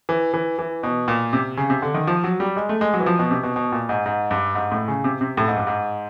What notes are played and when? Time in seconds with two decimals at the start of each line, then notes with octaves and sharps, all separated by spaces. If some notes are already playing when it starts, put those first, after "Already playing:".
0.09 E3
0.34 E3
0.59 E3
0.83 B2
1.08 A#2
1.33 C3
1.57 C#3
1.70 C3
1.82 D3
1.94 D#3
2.07 F3
2.24 F#3
2.40 G3
2.57 G#3
2.69 A3
2.81 G#3
2.94 F#3
3.00 E3
3.06 F3
3.19 B2
3.31 C3
3.43 B2
3.56 B2
3.72 A#2
3.89 G#2
4.06 G#2
4.31 G2
4.55 G#2
4.72 A2
4.88 C#3
5.04 C3
5.21 C3
5.37 A2
5.48 G#2
5.57 G2
5.67 G#2